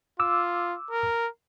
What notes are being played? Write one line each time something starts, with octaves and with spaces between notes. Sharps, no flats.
F4 D6 E6
A#4